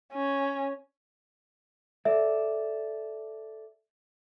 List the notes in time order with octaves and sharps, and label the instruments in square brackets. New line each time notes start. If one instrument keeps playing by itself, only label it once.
[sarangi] C#4
[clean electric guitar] A4 D5 [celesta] E5